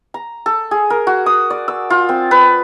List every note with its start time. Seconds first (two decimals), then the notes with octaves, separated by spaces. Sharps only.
0.14 A#5
0.46 A4
0.71 G#4
0.90 A#4
1.07 F#4
1.26 D#6
1.50 D5
1.68 E6
1.90 F4
2.09 C4
2.31 B4